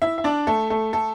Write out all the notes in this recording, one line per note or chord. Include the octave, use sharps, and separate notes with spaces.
E4 E5
E5
D4 D5
A3 A4
A3 A4
A3 A4